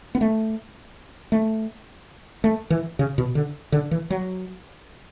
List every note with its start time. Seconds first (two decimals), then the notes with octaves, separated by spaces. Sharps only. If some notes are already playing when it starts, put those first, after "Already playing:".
0.15 B3
0.21 A3
1.32 A3
2.44 A3
2.70 E3
2.99 C#3
3.18 B2
3.35 D3
3.72 D3
3.91 E3
4.10 F#3